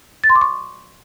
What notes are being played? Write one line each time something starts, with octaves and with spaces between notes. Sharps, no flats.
A6
C6
D6
C#6